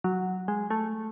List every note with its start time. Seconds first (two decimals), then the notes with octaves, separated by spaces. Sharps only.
0.04 F#3
0.48 G#3
0.70 A3